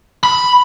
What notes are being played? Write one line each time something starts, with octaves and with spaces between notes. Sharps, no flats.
B5